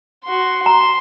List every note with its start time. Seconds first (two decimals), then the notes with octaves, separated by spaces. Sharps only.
0.24 F#4 C6
0.66 A#5 C6